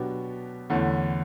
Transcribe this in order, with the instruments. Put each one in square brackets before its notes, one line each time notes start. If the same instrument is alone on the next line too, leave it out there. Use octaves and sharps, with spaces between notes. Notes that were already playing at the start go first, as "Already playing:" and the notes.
Already playing: [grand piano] B2 F#3 B3 D4 G4
E2 D3 A3 C#4 E4